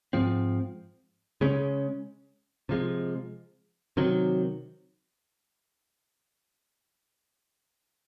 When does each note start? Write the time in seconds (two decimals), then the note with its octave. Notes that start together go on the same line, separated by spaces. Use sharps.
0.13 G#2 F3 C4
1.41 C#3 G#3 C#4
2.69 C3 F3 G#3
3.97 C3 D#3 F#3